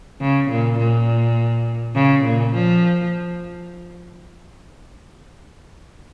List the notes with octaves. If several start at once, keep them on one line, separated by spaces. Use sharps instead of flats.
C#3
A#2
A#2
C#3
A#2
F3